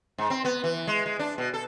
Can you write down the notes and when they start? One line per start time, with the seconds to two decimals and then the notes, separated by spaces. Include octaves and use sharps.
0.18 G#2
0.30 C4
0.45 B3
0.64 E3
0.87 G#3
1.06 G#3
1.19 D4
1.38 B2
1.54 A4